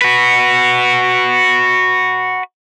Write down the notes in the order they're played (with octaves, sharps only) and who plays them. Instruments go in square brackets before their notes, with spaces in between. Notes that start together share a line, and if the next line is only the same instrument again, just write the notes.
[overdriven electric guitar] F#4 B4